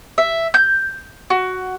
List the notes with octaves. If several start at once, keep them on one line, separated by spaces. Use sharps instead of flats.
E5
G6
F#4